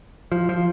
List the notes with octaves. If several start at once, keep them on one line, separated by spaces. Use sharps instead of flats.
F3
F3